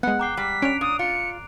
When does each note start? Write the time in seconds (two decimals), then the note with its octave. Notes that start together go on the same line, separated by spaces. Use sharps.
0.03 G#3 B3 F#5 F#6
0.19 G5 A#5 D6 C7
0.37 G3 B6
0.62 C#4 D4 D7 F7
0.81 A#2 D#6
0.99 F4 C#7